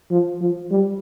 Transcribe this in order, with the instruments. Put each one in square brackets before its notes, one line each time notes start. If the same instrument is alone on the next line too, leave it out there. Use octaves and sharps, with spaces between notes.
[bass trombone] F3
F3
G3